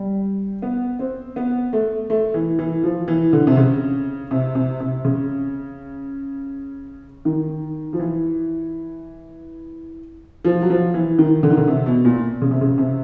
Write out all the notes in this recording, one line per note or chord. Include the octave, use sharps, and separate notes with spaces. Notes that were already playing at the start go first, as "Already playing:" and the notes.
Already playing: G3
B3
C4
B3
A3
A3
E3
E3
F3
E3
D3
C3
C#3
C3
C3
C3
C#3
D#3
F3
E3
F3
F#3
F3
E3
D#3
D3
D#3
D3
C3
B2
A#2
C#3
C3
C#3
C3